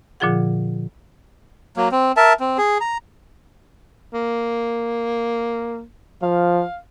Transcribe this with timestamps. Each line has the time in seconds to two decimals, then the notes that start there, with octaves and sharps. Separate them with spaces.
0.20 A#2 D3 F3 F4 G#4 F#5
1.77 F#3 A#3
1.92 C4
2.17 A#4 E5 A5
2.40 C4
2.58 G#4
2.81 A#5
4.13 A#3
6.22 F3 F5